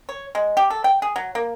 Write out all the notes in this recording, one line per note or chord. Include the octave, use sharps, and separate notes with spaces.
C#5
G#3
G4
A4
G5
G#4
F#3
A#3